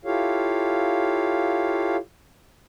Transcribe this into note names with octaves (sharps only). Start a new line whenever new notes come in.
E4 F4 G4 A4 C#5 F5